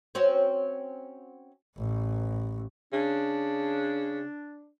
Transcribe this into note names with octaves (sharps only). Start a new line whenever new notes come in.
C4 C#4 F#4
A1
C#3 D4